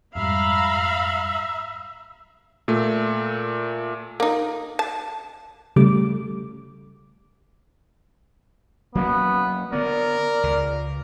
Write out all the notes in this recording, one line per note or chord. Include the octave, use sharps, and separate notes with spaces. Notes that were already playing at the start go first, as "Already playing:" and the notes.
F2 G#2 G3 E5 F5 A#5 B5
A#2 A3
A#3 D#4
A5
C#3 G3 A3 D6
F#3 A#3 B3 C#4
D3 B3 A#4 D5
C#2